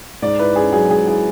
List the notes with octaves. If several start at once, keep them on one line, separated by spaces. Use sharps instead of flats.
G#2 D5
E4 B4
C#4 G#4
F#3 G#4
G#2 G#4
E4 G#4